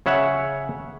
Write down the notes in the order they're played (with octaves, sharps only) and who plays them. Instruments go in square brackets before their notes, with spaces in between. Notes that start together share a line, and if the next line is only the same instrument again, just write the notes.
[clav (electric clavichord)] C#3 C#5 E5 F#5